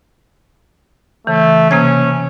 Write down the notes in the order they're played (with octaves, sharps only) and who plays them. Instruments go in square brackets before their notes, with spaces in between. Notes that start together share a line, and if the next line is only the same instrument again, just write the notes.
[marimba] C#3 E3 [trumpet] A3
[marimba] C3 A#3 G#6 [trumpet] C#4